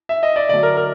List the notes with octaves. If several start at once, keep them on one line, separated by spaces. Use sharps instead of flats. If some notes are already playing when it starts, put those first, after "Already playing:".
E5
D#5
D5
D3 F#3 A3 D5
A#4
A#4